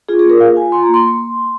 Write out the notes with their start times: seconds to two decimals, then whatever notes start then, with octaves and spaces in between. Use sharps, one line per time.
0.09 F4 G#4
0.19 G#4
0.25 A#3 A#4
0.40 F4 F5
0.56 F4 G#5
0.72 F4 C6
0.83 A#5
0.89 A#3
0.94 C6
1.05 A#3